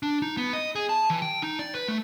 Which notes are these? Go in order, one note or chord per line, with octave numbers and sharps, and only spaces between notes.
D4
D#4
B3
D#5
G#4
A5
E3
G5
D#4
D5
B4
A3